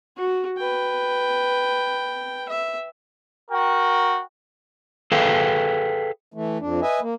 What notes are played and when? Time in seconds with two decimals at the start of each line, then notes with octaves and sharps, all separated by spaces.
0.17 F#4
0.58 B4 G5
2.49 E5
3.51 F#4 A#4 G5
5.12 G#4 A4 B4 F5 G5
6.34 E3 A3
6.60 F2 D4
6.82 B4 D#5 E5 G#5
7.01 A#3